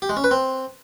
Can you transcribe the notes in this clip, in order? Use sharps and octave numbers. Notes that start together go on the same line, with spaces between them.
G4
G#3
C#4
B4
C4